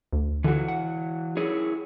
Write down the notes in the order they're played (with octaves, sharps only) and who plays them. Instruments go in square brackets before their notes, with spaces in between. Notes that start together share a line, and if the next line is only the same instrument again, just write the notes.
[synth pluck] D2
[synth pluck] D3 [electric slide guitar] E3 F#4
[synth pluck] F#5
[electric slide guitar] E4 G#4 C#5